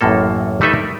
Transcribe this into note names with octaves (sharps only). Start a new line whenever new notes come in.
A1 F#2 A2 A#3 A4
G3 A3 D#4 A4 B4 E5
A#4